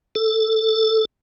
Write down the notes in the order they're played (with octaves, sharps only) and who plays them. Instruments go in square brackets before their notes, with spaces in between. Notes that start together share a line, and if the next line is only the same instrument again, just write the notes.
[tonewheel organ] A4